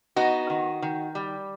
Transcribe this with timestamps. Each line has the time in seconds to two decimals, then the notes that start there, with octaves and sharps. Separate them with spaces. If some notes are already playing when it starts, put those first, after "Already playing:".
0.16 B3 D#4 F#4
0.50 D#3
0.82 D#3
1.15 G3